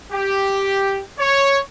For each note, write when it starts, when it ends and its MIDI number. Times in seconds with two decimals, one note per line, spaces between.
0.13 1.01 67
1.19 1.60 73